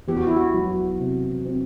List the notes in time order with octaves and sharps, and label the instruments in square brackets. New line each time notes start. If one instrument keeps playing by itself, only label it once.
[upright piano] E2 [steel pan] G4
[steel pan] F#4
E4
F#4
[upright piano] F#3
C3
C4